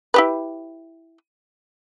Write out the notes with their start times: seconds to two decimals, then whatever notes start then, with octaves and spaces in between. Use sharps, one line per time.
0.14 E4 G4 B4